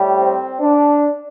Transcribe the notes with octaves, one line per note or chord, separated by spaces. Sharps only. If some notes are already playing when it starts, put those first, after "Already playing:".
Already playing: A2 G3
C4
D4